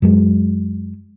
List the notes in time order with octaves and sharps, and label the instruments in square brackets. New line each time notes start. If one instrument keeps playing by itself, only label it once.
[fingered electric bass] F#2 F#3 G#3